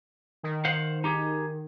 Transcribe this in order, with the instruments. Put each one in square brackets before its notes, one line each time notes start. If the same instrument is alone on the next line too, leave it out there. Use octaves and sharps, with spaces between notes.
[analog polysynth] D#3
[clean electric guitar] C5 F5 F#5
D#4 G4 G#4